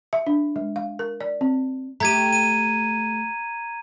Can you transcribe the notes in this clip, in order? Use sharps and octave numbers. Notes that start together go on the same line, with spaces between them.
E5
D4
G#3
F5
A#4
D5
C4
A3 G4 A#5 G#6 D#7
D#7